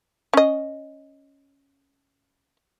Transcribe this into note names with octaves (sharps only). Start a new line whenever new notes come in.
C#4 D#5